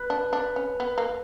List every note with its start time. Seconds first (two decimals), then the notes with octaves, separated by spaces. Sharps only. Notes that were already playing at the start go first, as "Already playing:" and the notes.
Already playing: B4
0.10 D4
0.33 D4
0.56 C#4
0.80 B3
0.98 A#3